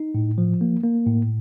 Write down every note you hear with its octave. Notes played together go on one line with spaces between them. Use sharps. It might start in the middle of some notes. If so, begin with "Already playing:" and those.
Already playing: D#4
A2
F3
A#3
A#3
A2